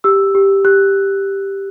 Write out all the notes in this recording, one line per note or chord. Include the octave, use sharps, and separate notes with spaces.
G4 E6
G4
G4 F#6